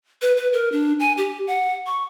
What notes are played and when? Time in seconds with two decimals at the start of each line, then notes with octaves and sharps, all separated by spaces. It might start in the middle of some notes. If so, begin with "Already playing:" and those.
0.22 B4
0.37 B4
0.53 A#4
0.72 D4
1.00 G#5
1.17 G4
1.47 F#5
1.87 C#6